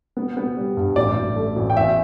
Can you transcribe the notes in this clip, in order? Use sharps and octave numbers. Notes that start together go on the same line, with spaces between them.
B3
B3
G3
G2
A1 D5
A1
A3
A1
G5
E2 E5